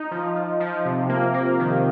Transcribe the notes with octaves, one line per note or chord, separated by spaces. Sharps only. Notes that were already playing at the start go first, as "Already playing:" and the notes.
Already playing: D#4
F3
F3
F3
C3
A#3
A#3
D#3